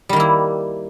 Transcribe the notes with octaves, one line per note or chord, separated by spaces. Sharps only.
D#3 G3 A#3 E4